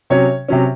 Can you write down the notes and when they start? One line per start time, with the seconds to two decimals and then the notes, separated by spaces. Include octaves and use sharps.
0.10 C3 F#3 C#4 C#5
0.48 C3 F#3 C#4